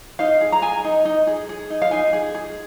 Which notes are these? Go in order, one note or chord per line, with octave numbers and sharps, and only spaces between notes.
D#4 F5
G#4
A#5
G#4 G#5
D#4
D#4
G#4
G#4
D#4
F5
D#4 G#5
G#4
G#4